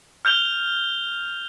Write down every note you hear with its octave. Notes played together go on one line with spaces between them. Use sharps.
F6 G6 F7 G7